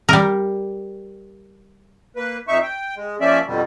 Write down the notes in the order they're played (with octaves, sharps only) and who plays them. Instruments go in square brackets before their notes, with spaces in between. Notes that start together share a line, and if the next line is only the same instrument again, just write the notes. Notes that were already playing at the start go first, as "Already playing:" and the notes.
[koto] G3 A#4
[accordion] A#3 B4
F2 D#4 E5 C#6
G5
G#3
F3 A#3 C#4 D5 E5
F2 B2 D3 G3